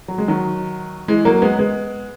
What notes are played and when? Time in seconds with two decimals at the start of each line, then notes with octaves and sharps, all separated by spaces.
0.08 F#3
0.18 G#3
0.28 D#3 F#3
1.08 E3 G#3
1.25 F#3 A#3
1.42 G#3 B3
1.59 G#3 B3